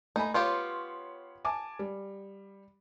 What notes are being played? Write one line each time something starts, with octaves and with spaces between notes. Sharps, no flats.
A3 D#4 G#5 B5
B3 F4 G4 C#5 C6
G#5 A5 D6
G3